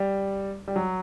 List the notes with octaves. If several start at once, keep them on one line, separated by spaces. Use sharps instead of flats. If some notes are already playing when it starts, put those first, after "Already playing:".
Already playing: G3
G3
F#3